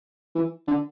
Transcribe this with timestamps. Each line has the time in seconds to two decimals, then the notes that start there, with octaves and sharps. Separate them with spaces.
0.35 E3
0.68 D3